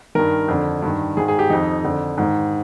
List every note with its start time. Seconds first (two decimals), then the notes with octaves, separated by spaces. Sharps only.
0.15 G2 D#3 A#4
0.48 F2 D3
0.82 G2 D#3
1.17 G#2 D#3 G#4
1.28 G#4
1.39 G4
1.50 F2 D#3 D#4
1.84 F2 D3
2.18 G#2 D#3